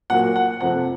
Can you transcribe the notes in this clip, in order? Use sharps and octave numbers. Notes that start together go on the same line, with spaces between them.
A#2 F#3 A#3 F#5
F#5
F2 C3 F3 A3 F#5